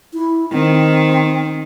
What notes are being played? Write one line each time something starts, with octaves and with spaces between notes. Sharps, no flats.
E4
D#3 C4